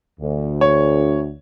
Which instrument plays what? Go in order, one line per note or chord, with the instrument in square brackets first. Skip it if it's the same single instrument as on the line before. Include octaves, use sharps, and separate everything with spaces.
[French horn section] D2
[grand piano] C#5